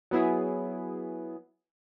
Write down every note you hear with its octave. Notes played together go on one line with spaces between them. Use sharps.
F#3 B3 E4 G#4